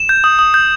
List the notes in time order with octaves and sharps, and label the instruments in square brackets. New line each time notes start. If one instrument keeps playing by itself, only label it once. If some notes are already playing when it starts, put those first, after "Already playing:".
Already playing: [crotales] E7
G6
D#6
D#6
G6